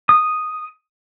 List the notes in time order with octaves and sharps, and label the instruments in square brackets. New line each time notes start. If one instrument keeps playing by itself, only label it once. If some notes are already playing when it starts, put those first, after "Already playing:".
[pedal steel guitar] D#6